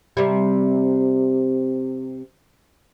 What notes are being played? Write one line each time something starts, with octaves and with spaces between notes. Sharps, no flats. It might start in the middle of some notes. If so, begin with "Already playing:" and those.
C3 G3